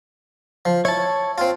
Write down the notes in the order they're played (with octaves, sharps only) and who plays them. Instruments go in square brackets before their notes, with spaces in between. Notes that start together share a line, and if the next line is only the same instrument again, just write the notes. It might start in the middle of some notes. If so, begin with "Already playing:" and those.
[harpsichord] F3
[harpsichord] E4 [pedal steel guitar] C#5 A5
[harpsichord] C4 F4